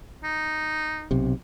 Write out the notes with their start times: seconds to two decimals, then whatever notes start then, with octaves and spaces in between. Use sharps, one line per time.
0.24 D#4
1.11 B1 C3